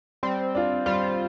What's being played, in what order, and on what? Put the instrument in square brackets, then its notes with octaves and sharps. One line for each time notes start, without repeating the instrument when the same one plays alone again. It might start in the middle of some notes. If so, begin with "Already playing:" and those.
[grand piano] G3 [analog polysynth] C4
[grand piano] D4 F4
[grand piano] G3 [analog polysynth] F4